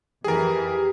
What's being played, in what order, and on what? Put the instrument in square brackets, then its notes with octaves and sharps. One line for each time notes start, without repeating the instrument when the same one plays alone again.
[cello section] F2 E3 [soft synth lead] G4 [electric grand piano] G#4 A#4